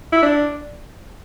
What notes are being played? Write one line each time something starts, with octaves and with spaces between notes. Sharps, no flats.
E4
D4